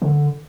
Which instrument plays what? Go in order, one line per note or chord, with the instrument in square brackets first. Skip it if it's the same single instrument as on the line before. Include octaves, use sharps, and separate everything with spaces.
[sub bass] D3